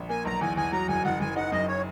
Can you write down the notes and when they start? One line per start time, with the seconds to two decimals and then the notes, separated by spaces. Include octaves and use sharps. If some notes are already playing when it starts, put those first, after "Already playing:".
Already playing: A#1
0.09 A#3 G#5
0.25 B1 A#5
0.41 E2 G#5
0.57 E2 G#5
0.72 F#3 A#5
0.88 F#1 G#5
1.05 F#1 F#5
1.20 F#1 G#5
1.36 D#4 F#5
1.52 F#2 D#5
1.68 C#5